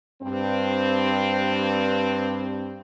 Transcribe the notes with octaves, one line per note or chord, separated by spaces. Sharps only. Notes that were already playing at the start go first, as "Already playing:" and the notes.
G2 C4